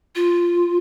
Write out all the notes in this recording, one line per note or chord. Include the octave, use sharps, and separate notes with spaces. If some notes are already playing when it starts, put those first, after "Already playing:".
F4